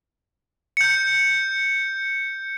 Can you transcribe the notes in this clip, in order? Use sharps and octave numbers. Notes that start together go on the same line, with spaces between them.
G6 C#7